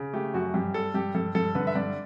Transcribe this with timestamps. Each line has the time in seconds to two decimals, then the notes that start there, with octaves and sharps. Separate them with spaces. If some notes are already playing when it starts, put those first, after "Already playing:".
Already playing: C#3
0.14 A3 G4
0.34 F#2 F#4
0.54 G2 G4
0.74 G3 A4
0.94 G2 G4
1.15 G2 A4
1.35 G2 A4
1.55 D3 B4
1.67 E5
1.75 G2 D5